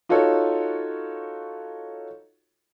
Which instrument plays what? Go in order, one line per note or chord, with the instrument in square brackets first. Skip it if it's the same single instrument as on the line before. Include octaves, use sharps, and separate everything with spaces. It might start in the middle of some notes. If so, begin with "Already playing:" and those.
[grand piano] D#4 F4 F#4 A4 C#5